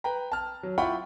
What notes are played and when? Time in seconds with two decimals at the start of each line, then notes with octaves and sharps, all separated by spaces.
0.04 B4 G5 A#5
0.32 A5 F6
0.63 F#3
0.78 E4 F4 F#5 G5 B5 C#6